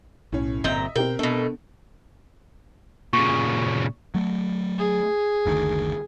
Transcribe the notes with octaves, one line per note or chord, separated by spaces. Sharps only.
B1 A2 C#4
G1 A#2 C4 D#5 E5 G5 A#5
B2 C4 G4 A#4 G5
B2 A3 B3 D4
A#2 C#3 C#6
F#3 A3
G#4
F#1 D2 D#3